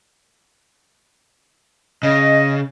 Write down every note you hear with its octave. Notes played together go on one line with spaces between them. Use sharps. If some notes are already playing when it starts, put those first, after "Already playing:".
C#3 D#5